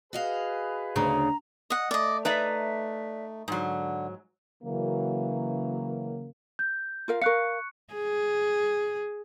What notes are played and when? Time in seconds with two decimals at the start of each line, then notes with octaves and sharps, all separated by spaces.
0.13 F#4 G#4 B4 D#5 F5
0.96 D2 C#3 A#5
1.70 D#5 F#5
1.91 A3 D5 D#5
2.25 D#4 B4 D5 E5 A#5
3.48 G#2 D3 F#3
4.63 C#3 E3 F#3 A#3
6.59 G6
7.08 F4 A#4 F5
7.22 A#4 F5 C#6 F#6 C#7
7.94 G#4